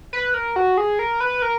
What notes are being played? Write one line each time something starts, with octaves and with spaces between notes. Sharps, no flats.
B4
A#4
F#4
G#4
A#4
B4
A#4